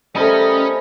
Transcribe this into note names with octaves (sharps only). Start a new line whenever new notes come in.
G3 A3 C#4 A#4 C5 D#5 G#5 B5